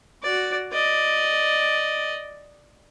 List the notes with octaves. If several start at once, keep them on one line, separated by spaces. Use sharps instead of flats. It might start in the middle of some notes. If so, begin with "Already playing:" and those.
F#4 D5
D5 D#5